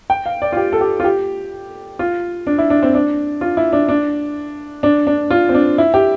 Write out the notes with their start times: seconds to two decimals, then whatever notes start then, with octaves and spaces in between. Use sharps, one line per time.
0.10 G5
0.26 F5
0.42 D5
0.52 F4
0.57 G4
0.73 A4
0.81 G4
1.00 F4
1.04 G4
1.99 F4
2.47 D4
2.58 E4
2.70 D4
2.83 C4
2.94 D4
3.41 F4
3.57 E4
3.73 D4
3.89 D4
4.83 D4
5.07 D4
5.30 F4
5.49 C4
5.54 D4
5.78 E4
5.94 G4